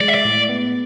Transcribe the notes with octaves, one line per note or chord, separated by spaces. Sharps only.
G#3 D5
E5
D5
A2
B3